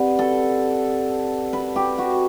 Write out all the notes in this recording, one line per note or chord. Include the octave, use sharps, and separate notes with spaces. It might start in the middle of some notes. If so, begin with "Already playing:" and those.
Already playing: C4 G4 B4 D5 F#5
A4
B4
G4
F#4